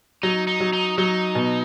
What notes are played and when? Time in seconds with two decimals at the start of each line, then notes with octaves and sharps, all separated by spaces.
0.23 F#3 D#4
0.47 D#4
0.60 F#3
0.73 D#4
0.98 F#3 D#4
1.35 B2